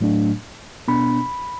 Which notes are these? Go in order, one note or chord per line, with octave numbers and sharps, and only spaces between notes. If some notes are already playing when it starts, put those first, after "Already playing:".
A2 F#3 A3 D4
B2 B3 D4 B5